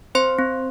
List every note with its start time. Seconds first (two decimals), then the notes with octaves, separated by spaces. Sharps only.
0.15 C4 C5 C6
0.39 C4